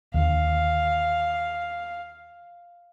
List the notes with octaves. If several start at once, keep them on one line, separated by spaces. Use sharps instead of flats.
D#2 D3 F5